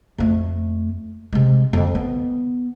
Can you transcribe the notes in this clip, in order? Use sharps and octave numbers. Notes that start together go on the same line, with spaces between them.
F2 A3
C3 G#3
F2 D3
B3